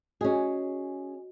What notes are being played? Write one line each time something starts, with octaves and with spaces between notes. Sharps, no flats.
C#4 F#4 G#4 D#5